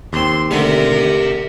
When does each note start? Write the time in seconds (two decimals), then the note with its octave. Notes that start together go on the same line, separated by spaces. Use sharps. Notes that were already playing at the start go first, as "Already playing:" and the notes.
0.13 D#2 C4 C6
0.51 D3 A3 G4 A#4 E5